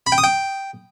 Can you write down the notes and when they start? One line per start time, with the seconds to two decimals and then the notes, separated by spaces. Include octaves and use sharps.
0.07 B5
0.12 G5
0.18 D#6
0.24 G5